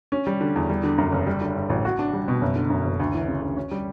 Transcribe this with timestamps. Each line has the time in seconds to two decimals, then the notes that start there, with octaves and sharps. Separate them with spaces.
0.12 C#4
0.27 G3
0.41 D3
0.56 E2
0.70 G3
0.83 D3
0.98 F#2
1.12 F#1
1.27 G3
1.41 D3
1.55 G2
1.70 A1
1.85 F#4
1.99 D4
2.13 G3
2.28 B2
2.41 F#1
2.56 D3
2.70 F#2
2.85 F#1
3.00 D2
3.14 E3
3.28 C#3
3.42 D2
3.56 C#4
3.71 G3